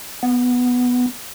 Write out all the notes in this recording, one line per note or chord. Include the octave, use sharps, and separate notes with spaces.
B3